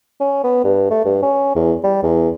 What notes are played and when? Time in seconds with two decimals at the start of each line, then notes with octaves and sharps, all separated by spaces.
0.20 C#4
0.44 B3
0.64 G2
0.90 A3
1.05 G2
1.23 C#4
1.56 E2
1.84 G3
2.03 E2